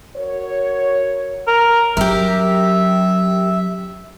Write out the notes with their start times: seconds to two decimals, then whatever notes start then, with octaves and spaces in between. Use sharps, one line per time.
0.17 F#4 A#4 C#5
1.47 A#4
1.97 F#3 C#4 G4 A#4 E5